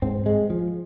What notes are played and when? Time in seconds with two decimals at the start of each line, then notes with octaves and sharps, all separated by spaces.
0.02 G#2 C4
0.26 G#3
0.50 F3